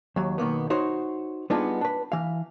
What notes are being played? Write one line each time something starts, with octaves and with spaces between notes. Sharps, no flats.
D#2 F#3
B2 D#3 A#3 B3
D#4 F#4 C5 C#5
G3 B3 D4 D#4 F4 G#4
D4 B4
E3 F5